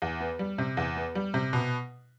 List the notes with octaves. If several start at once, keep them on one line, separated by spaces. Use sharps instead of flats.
E2
B3
G3
C3
E2
B3
G3
C3
B2